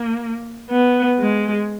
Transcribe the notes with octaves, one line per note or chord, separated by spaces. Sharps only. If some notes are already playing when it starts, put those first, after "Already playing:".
Already playing: A#3
B3
G#3